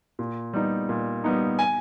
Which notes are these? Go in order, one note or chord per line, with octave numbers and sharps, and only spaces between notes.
A#2
G3 B3 D#4
A#2
G3 B3 D#4
G#5